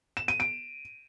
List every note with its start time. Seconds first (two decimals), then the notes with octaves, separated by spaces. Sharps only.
0.17 E7
0.28 D#7
0.40 D7